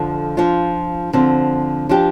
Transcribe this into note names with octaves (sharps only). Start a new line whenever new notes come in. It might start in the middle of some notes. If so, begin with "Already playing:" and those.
Already playing: F2 D3 F3
F3 D4 F4
D3 F3 C4
F3 D4 G4